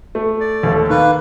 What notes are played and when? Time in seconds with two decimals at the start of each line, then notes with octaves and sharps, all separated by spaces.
0.15 A3
0.41 D5
0.63 D#2 A3 A4
0.90 D#3 A#3 B4